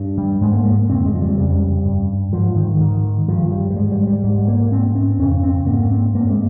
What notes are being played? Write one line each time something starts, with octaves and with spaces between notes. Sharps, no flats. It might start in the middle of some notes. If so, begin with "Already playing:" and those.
Already playing: G2
G3
G#2 G#3
A#3
A#3
F2 C#3 C4
G#3
F3
G3
F2 C#3 G3
G2
G#2 F3
D#3
G#2 D#3
G2 F3
G3
G3
G#2 G#3
G3
G3
G#2 G3
A#3
G#2 C4
C#4
F2 C#3 C#4
C4
G#2 A#3
C4
G2 A#3
G#3